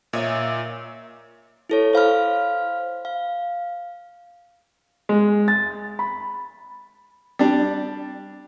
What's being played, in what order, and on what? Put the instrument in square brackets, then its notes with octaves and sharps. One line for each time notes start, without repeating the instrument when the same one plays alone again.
[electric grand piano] A#2 [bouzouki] D#4 C#5 E5
[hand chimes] E4 A4 C#5
C5 F5 B5 F6
F5
[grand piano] G#3
A6
B5
[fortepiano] G3 D4